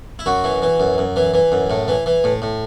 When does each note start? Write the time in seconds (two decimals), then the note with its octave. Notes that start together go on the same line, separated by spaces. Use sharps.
0.19 E4
0.26 F#2 F#4
0.44 E3
0.62 E3
0.80 F#2
0.98 F#2
1.16 E3
1.34 E3
1.52 F#2
1.70 A2
1.88 E3
2.06 E3
2.24 A2
2.42 A2